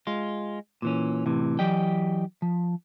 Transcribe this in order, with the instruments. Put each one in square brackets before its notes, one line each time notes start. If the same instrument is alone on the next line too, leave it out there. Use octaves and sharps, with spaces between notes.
[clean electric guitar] G#3 F4
A#2 E3 C#4
A2 C3 E3
E3 F#3 G4 D5 D#5 G5
F3